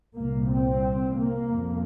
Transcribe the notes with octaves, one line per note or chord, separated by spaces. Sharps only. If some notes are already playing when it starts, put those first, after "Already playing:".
C2 A#2 A#3
C4
A#3
F2 C3